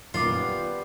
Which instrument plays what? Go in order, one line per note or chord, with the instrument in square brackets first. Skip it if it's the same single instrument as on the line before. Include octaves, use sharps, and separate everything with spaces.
[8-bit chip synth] F#2 A#2 D#3 [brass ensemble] G3 B3 [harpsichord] F4 [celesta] D6 C7